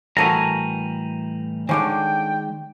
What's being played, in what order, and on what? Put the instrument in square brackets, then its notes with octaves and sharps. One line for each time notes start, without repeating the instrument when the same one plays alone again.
[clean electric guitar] A2 E3 G3 [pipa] F#4 A4 A#4 [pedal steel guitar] G#5 A#5
[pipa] D3 G3 C#4 [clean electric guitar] D#3 G#3 D5 [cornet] G5